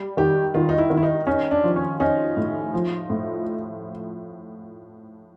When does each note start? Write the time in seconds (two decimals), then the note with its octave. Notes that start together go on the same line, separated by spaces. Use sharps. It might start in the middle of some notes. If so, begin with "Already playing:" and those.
Already playing: G3
0.17 D#3 G4
0.54 D#3 F4
0.69 D#4
0.78 E4
0.90 D#3
0.97 E4
1.03 D#4
1.27 C#4 D#4
1.51 D4
1.63 F3
1.76 C#4
2.00 C#4 D#4
2.37 A2
2.74 F3
3.10 A2